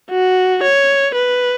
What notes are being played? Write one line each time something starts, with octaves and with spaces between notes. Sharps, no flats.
F#4
C#5
B4